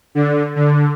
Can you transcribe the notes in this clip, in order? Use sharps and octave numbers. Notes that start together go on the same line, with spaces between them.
D3
D3